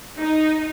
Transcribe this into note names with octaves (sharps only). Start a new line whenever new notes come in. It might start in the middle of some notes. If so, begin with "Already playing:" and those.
D#4